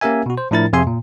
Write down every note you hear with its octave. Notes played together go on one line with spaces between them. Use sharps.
A#3 C#4 G4 A#4 E5 G#5
B2 F#4
C5
A2 F3 D4 E4 A#4 A6
F2 C3 G#4 E5 G#5 C6
A#2